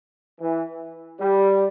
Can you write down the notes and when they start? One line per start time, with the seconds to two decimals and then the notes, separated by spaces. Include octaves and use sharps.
0.39 E3
1.19 G3